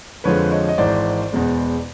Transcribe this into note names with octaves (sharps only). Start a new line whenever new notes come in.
F2 D3 F3 G#3 B4 C#5
C#5 D#5
D#5
G#1 G#2 E3 C5 D5
E2 B2 G#3